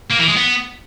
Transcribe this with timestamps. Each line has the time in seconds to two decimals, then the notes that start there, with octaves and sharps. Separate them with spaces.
0.11 A#3
0.20 E3
0.28 G#3
0.37 B3